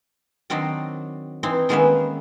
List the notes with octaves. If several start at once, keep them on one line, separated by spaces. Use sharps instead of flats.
D#3 F#3 C4 D4 D#4
E3 C4 D#4
D#3 G#3 A#3 B3 C#4 E5